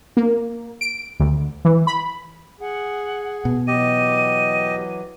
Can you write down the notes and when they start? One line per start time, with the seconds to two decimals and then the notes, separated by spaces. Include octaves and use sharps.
0.17 A#3
0.81 D7
1.20 D2
1.65 E3
1.87 B5
2.61 G#4 F#5
3.45 B2
3.68 E3 F#3 G4 D#5 D#7